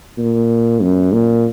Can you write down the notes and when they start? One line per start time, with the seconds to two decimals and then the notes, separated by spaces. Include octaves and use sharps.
0.18 A#2
0.82 F#2
1.14 A#2